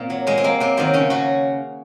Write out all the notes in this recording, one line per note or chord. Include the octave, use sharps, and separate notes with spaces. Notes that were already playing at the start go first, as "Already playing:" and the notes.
Already playing: A#2 A#3 C4
F#3
A#2 G#3
C4
F#3 A#3
C3 C4
D#3 F#3 C4
C#3 C#4
F#3 F#4